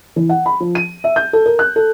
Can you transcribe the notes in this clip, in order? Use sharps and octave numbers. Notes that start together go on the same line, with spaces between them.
E3
F#5
B5
F3
D#7
E5
G6
A4
A#4
F#6
A4